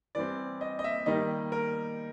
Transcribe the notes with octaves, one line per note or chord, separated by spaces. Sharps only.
E3 G3 C4 D5
D#5
D#5
E5
D#3 G3 A#3 D#4 D#5
A#4